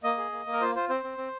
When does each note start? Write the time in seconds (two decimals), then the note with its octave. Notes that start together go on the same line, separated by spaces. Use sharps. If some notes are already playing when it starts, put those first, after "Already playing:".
0.03 A#3 D#5
0.18 G#4
0.32 A#3
0.46 A#3
0.53 A#4
0.61 F4 C5
0.75 F4 C5
0.89 C4 C5
1.04 C4
1.18 C4